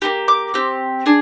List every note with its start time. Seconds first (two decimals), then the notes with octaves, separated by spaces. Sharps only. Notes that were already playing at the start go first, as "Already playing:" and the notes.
0.02 A#3 D#4 G4
0.28 D6
0.54 C4 G4
1.06 D4 G#4